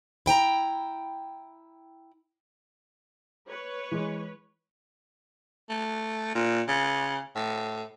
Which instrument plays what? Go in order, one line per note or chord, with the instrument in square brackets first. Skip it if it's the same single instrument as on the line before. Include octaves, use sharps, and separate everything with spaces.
[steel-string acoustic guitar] E4 G5 A5 A#5
[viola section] B4 C#5
[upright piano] E3 G#3
[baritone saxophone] A3
A#2
C#3
A2